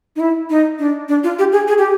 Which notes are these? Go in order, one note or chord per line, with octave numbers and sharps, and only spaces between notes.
D#4
E4
D#4
D4
D4
F4
G4
G#4
G#4
G4